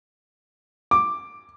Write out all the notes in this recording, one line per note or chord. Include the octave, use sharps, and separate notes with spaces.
D6